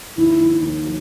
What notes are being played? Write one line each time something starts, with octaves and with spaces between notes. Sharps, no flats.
D#2 E4
D#2
D#2
F#3